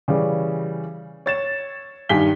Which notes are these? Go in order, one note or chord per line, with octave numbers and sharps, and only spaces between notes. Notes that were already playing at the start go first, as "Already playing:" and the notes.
C#3 E3 G3 C#4
C#5 A6 E7
G2 D#3 G#5 B6 G7